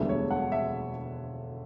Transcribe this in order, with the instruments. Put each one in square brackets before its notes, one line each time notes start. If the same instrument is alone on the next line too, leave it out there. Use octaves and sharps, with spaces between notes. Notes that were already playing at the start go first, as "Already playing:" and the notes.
Already playing: [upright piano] E1 D2 D3 G3 B3 E5
C#5
F#5
E5